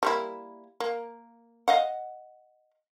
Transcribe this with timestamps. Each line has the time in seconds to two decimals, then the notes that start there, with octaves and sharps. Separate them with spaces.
0.03 G3 A#3 E4
0.80 A#3
1.68 D#5 F5 F#5